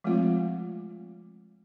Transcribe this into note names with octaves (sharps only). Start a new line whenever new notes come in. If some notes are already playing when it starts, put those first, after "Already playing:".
F3 G#3 A3 C4 F4